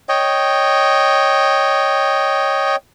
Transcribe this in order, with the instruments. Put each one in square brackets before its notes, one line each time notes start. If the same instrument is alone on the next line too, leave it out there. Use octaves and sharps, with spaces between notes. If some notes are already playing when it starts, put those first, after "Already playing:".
[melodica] C#5 D#5 G5